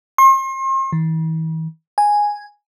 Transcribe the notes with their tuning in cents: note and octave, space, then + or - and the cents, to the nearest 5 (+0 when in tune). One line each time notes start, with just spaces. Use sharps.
C6 +40
E3 -45
G#5 -5